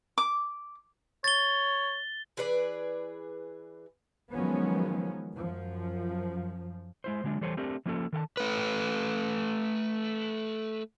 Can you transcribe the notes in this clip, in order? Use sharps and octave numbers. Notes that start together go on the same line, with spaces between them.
D6
C#5 A6 G7
E3 G#4 B4 D5
D#3 F3 F#3 G#3 B3 C#4
F#2 F3
G#3 E4 C5
D3 F#3 G#3 D4
E3 G3 A4 C5 C#5
A3 C4 D4 G4 A#4
F3 A#3 C#4 F4 F#4 A4
D#3 A4 F5 A5
A3 B4